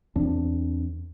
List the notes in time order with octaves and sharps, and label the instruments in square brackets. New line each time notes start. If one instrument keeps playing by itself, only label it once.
[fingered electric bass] E2 C4 D4